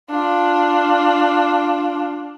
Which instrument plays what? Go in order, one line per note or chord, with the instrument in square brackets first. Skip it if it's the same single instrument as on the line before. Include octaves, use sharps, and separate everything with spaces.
[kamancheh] D4 F4